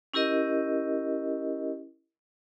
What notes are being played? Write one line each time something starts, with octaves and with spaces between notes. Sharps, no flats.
C#4 E4 G4 A#4 D#5